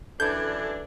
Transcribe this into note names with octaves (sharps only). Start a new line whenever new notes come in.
F#2 E3 D4 A4 B4 G6 G#6